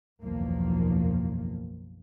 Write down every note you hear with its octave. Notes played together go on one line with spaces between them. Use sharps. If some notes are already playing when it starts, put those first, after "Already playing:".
F#1 B1 E2 D#3 F3 A#3